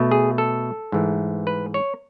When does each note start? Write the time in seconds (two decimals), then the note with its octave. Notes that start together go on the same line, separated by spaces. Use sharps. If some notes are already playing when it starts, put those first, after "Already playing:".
Already playing: B2 A3
0.11 G#4
0.38 A4
0.92 G#2 E3 A3
1.47 B4
1.74 C#5